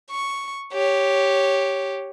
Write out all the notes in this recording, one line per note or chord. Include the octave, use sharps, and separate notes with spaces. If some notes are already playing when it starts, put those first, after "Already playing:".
C#6
G4 C#5